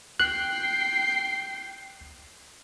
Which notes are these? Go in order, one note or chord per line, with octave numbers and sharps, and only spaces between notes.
G5 F#6 C7